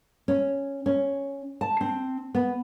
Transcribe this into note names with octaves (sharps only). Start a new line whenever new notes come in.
C#4
C#4
A5
C4
B3